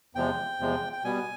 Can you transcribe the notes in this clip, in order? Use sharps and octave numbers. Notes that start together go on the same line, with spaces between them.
E2 C3 F3 G#3 G5
E2 C3 F3 G#3
G5
B2 G3 B3 G#5